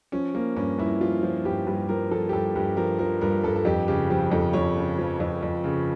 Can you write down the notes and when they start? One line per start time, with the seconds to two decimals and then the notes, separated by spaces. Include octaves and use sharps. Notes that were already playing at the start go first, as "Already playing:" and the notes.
0.12 F3 C#4
0.34 F3 A#3
0.56 G2 C#4
0.78 G2 E4
1.01 F3 F4
1.23 F3
1.45 G2 G4
1.67 G2 G4
1.89 F3 A#4
2.11 F3 A4
2.29 G4
2.33 G2 A4
2.55 G2 G4
2.77 F3 A#4
2.99 F3 A#4
3.21 G2 A#4
3.43 G2 A4
3.56 A4
3.65 F2 G4
3.88 C#3 G4
4.10 F3 G4
4.32 F2 A4
4.53 F2 C#5
4.76 C#3
4.98 F3
5.20 F2
5.43 F2
5.64 C#3